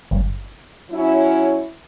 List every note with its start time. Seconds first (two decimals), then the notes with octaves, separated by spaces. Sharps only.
0.11 G1
0.91 F#3 C#4 E4